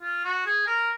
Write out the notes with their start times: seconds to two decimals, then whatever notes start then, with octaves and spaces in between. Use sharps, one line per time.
0.02 F4
0.24 F#4
0.46 G#4
0.67 A#4